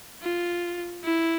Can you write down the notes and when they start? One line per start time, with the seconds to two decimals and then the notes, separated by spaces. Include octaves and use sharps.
0.22 F4
1.03 E4